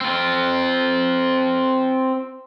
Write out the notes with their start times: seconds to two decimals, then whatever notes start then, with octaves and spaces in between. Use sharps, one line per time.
0.01 C4 F4